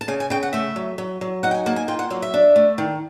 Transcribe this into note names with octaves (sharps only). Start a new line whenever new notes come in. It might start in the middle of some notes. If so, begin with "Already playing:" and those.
A5
C#3 G#5
G#5
C#3 G5
F#5
A3 E5
F#3
F#3
F#3
D#4 F#5
G5
G#5
A#3 A5
G#5
F4 G5
F#5
F#3 F5
E5
D4
A3
D#3